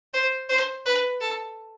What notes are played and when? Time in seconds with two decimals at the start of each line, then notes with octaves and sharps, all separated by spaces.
0.13 C5
0.49 C5
0.85 B4
1.20 A4